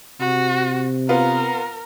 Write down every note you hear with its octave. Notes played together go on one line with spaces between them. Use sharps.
C3 F#4
B3 F4 A#4